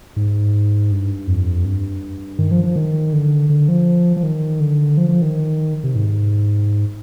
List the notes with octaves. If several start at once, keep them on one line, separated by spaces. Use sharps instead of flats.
G#2
G2
F2
G2
D#3
F3
F3
D#3
D3
D3
F3
F3
D#3
D3
F3
F3
D#3
C3
G#2